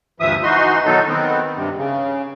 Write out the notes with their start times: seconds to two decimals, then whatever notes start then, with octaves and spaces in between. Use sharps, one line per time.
0.20 D2 G2 E3 F3 E5 D#6
0.43 E3 D#4 F#4 C6
0.85 B2 D#3 F#3 D#4 A4
1.08 D#3 B3 C4
1.56 G2 C3
1.78 C#3